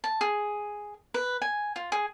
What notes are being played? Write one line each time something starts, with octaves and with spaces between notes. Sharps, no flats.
A5
G#4
B4
G#5
F4
G#4